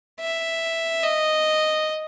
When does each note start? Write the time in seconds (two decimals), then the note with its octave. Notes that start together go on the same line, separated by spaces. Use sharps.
0.20 E5
1.03 D#5